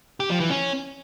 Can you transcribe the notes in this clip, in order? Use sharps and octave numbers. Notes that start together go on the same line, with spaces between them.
G4
F3
E3
C#4